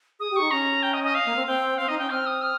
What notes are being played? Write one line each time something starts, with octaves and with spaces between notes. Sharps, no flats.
G#4 D#6
G4
D#4 C#6
C#4 A#5
G5
D#5
D#5
F5
A#3
C4
C4 G5
C4 F5
D#4 D#5
C#4 G5
C4 F6
D#6
F6